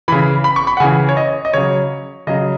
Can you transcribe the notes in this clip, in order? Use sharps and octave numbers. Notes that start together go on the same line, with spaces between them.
C#3 E3 B5
B5
C#6
B5
F#5
C#3 E3 G#5
C#5
D#5
D#5
C#3 F#3 C#5
C#3 F#3 D#5